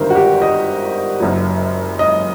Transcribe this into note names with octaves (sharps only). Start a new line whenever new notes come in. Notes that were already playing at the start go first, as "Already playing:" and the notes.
Already playing: G1 G2 D#3 A#4 C5
F#4
G4
D#5
F#1 F#2 F#3
D#5